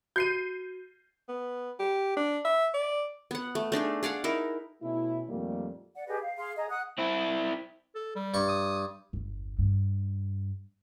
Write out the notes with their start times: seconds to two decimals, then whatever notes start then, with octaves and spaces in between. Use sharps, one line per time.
0.16 F#4 G6 C7 D#7
1.28 B3
1.79 G4
2.17 D4
2.45 E5
2.74 D5
3.31 B3 F#5
3.55 A3
3.72 A3 D4 D#4 G#4
4.03 G#4 D5 F5 F#5
4.24 D#4 E4 A#4
4.83 B2 A3 C#4 E4
5.28 F2 A#2 D#3 G3 A3 A#3
5.94 D5 F#5
6.07 G4 G#4 B4 D#5
6.22 F5
6.37 G#4 F5 C6
6.56 G#4 D#5 A#5
6.69 F#5 D#6 F#6
6.98 C4 E4
7.95 A4
8.16 G3
8.34 G2 C#6
8.49 D#6
9.13 G1 E2
9.59 G2